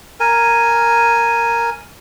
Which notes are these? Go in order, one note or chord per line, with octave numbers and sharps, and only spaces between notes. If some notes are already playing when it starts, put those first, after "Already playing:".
A#4 G#5